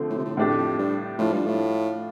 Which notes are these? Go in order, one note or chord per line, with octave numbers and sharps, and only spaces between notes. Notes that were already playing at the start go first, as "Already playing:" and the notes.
Already playing: D3 F3 A3 C4
A2
C3
A2
F2 A2 A3 D4 G4
F2
G2
A2 F3 D4 F4
G2
A2